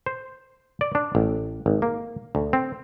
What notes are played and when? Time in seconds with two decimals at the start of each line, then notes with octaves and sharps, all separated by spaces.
0.06 C5
0.81 D5
0.95 D4
1.15 A1
1.66 G#1
1.82 A#3
2.35 D2
2.53 C4